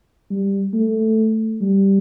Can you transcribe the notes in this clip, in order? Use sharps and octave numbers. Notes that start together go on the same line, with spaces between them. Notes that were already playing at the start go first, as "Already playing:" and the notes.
G3
A3
G3